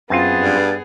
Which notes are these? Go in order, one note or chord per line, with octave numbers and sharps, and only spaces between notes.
F#2 B3 C4 F4 G#4 A5
G2